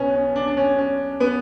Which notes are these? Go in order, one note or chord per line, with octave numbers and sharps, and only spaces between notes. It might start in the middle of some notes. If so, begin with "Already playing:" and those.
Already playing: B1 B2 B3 C#4
C#4
D4
D4
C#4
C#4
B3